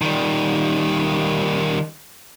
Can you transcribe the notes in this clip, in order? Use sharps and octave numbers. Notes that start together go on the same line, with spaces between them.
D#3 G3